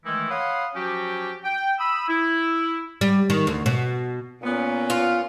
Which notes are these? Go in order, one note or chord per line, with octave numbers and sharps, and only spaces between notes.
D#3 E3 G#3 A3 D#4 E4
C#5 F5 F#5 B5 C6 D#6
F3 F#3 C#4 F#4 G4
G5
B5 D#6 E6
E4
G3
D#3
D2
B2
A#2 A#3 B3 C#4
F4